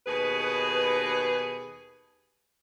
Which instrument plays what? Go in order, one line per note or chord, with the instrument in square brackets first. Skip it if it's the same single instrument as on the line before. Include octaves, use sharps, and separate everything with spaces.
[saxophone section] D#2 B2 G#4 B4